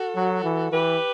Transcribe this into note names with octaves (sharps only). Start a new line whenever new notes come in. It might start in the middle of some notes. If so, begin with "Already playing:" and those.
Already playing: F#4 A4
F#3
E3
E3 G4 B4